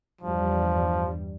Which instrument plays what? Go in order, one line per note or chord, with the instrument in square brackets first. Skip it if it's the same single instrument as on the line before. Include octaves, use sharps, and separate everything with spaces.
[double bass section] E2 G2 G3 [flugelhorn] F3